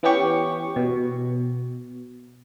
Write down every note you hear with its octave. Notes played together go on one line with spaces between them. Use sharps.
E3 B3 C#4 G4 C#6
B2